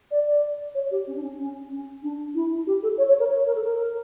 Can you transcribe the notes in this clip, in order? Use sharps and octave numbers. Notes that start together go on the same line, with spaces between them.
D5
D5
C#5
G4
C#4
D4
C#4
C#4
C#4
D4
E4
G4
A4
C#5
C#5
A#4
C#5
A#4
A4
A#4